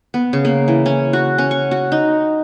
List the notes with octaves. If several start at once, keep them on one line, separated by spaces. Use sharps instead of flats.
B3
C#3
A#3
E3
C#4
F#4
C#4
C#6
F#4
D#4